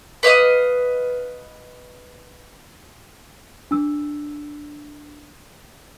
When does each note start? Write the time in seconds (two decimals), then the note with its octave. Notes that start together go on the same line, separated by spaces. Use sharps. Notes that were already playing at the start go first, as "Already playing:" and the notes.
0.23 B4 D#5 F5 D#6
3.71 D4 E6